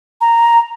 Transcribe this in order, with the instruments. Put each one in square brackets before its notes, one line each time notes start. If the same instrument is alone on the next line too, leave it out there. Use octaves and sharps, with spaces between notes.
[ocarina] A#5